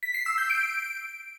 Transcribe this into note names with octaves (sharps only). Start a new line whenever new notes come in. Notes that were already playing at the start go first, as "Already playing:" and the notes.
B6
C7
E6
G6
D7